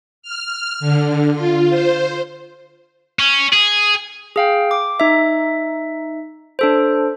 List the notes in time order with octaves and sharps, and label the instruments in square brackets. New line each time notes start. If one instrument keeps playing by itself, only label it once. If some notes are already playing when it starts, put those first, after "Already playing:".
[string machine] F6
D3
F4
C5
[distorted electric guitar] C#4
G#4
[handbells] G#4 F5 G5
D6
D#4 E5
D4 A4 C5